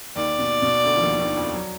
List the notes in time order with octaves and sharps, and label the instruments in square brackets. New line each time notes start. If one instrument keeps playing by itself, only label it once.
[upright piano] D#2 D#3 [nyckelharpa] D5
[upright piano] B2
B2
D2 D3
F3
D#2 D#3
D#2 D#3
F2 F3
F#3